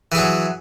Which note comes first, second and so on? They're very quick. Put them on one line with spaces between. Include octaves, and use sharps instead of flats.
E3 G#4 F#3